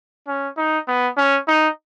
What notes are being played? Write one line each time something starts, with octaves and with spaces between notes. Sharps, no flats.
C#4
D#4
B3
C#4
D#4